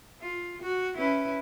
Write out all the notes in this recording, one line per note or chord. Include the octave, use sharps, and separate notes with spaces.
F4
F#4
C#4 E4 B4